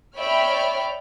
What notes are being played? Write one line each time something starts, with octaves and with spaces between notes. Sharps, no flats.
C#5 D5 E5 G5 B5 F6